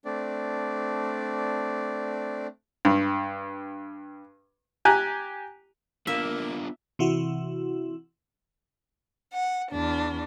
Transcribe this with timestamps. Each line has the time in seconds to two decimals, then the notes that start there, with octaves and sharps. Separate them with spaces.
0.05 A3 C4 D4 D5
2.85 G2
4.85 G4 G#5 A#5 F#6
6.07 A#3 B3 D4 F4 E5
6.99 C3 E3 E4 F#4
9.33 F#5
9.72 E2 D4